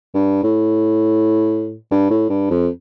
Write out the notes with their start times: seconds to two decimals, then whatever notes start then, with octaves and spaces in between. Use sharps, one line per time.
0.14 G2
0.43 A2
1.91 G2
2.10 A2
2.29 G2
2.50 F2